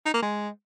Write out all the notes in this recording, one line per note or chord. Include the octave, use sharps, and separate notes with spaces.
D#4
A#3
G#3